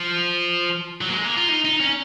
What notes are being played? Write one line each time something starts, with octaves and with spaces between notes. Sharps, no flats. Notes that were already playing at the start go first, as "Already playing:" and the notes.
Already playing: F3
F#3
A#3
G#3
A#3
F4
D#4
D#4
C#4